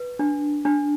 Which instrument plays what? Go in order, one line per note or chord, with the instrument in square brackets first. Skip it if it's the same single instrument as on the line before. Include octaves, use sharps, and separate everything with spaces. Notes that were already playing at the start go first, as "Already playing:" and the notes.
Already playing: [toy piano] B4
D4
D4